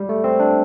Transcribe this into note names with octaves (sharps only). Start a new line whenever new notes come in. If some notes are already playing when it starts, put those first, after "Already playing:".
Already playing: G3
A3
C4
D4